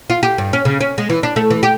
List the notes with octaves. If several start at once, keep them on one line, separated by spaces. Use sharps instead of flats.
F4
G4
G2
C#4
C#3
C#4
G#3
E3
D4
A3
E3
G4